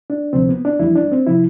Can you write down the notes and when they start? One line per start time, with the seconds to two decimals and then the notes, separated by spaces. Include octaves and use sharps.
0.10 D4
0.33 D2 C3 F3 C4
0.49 B3
0.65 D4
0.79 F2 E3 G3 E4
0.96 D4
1.12 C4
1.27 C3 F3 E4